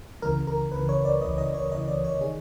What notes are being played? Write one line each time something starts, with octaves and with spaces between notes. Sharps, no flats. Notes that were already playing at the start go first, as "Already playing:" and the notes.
C#2 C#3 E3 A#4
A#4
C#2 C#3 E3 B4
C#5
D5
C#2 C#3 E3 D#5
D#5
C#5
C#2 C#3 E3 D#5
D5
C#5
D#3 G#4